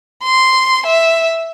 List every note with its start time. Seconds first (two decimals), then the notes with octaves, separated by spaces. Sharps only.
0.24 C6
0.86 E5